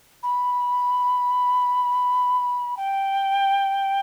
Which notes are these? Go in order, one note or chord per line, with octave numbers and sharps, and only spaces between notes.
B5
G5